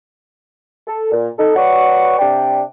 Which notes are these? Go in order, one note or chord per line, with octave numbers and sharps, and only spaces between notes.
A4
A#2
D#4 A4
F#4 B4 C#5 D5 F#5 C#6
C3 D4 D5 G5